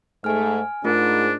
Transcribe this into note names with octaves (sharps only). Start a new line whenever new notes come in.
G#2 A3 G#5 F6
G#2 A3 D4 F4 A#4